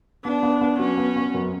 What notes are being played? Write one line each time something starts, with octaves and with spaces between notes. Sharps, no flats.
B3 D4
B3
B3
F#3 C#4
B3
B3
F#2